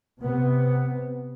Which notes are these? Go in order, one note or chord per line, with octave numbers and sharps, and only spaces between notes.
C3 B3